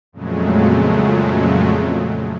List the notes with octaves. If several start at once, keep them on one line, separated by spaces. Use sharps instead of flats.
F2 A#2 C#3 F#3 G#3 A3